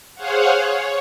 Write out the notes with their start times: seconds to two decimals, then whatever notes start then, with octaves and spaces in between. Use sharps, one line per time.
0.15 G#4 C5 C#5 F5 F#5
0.64 C#5